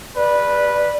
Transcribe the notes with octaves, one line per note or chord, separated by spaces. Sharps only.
B4 D5